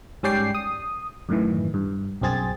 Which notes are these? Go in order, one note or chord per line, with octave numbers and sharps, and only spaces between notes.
G#2 G3 C#4 D5 G5 C7
D#6
F#2 A2 D#3 E3
G2
B1 F#2 C4 G#4 A6